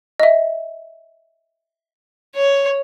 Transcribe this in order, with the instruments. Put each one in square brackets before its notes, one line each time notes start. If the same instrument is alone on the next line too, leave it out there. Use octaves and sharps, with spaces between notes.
[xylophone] D#5 E5
[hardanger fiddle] C#5